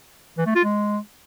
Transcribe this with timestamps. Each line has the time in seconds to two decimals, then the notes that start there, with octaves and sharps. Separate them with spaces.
0.38 E3
0.47 A3
0.55 F4
0.64 G#3